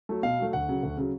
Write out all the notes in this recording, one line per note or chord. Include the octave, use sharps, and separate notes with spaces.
F#3 A3
B2 F5
F#3 A3
D2 F#5
C#3 F#3
D2
C#3 F#3